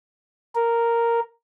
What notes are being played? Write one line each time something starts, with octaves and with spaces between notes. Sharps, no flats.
A#4